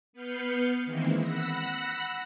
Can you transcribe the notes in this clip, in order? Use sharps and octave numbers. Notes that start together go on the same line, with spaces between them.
B3 B4 F6 G6 C7 C#7
D#3 E3 G#3 A#3 C4 E4
F#5 B5 E6 F#6 A#6